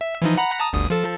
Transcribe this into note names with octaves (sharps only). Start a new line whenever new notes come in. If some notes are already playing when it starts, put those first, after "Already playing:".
E5
E3 F3 D#4
F#5 A#5 B5
A5 A#5 D#6
G1 D2 D#6
F3 A4